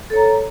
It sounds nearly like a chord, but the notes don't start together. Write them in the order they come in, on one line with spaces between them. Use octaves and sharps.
A4 C#5 A#5